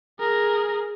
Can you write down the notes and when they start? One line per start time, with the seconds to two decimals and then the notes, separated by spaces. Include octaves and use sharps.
0.19 G#4 A#4